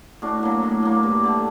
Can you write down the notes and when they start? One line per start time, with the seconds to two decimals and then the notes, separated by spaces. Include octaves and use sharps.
0.22 A2 D4 F#4
0.43 F#3 A#3
0.63 A2
0.83 F#3 A#3
1.03 G2
1.23 D3 A3